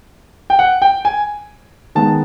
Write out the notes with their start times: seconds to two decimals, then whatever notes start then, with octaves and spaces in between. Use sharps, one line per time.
0.50 G5
0.59 F#5
0.82 G5
1.05 G#5
1.95 D#3 G#3 B3 A5